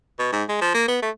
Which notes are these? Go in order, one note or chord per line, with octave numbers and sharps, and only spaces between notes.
B2
G#2
G#3
F3
A#3
B3
A3